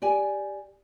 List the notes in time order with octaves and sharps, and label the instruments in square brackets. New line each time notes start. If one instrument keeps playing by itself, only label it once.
[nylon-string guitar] G4 D5 G#5